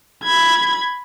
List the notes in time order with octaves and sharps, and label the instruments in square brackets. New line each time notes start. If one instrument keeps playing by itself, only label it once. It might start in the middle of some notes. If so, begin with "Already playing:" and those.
[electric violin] B5 G#6